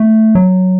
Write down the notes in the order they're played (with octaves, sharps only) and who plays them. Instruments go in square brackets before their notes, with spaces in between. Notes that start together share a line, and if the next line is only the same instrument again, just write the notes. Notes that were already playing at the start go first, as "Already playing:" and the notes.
Already playing: [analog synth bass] A3
F#3